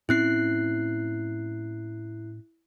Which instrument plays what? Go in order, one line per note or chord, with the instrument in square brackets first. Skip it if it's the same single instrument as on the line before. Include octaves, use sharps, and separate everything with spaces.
[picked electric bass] A2 C4 C#4 [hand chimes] E4 F#6 C7